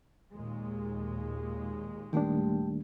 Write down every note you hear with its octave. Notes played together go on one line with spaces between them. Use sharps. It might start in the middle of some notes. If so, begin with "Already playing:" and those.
D#2 A#2 G#3
D#3 G3 A3 A#3 D4 G4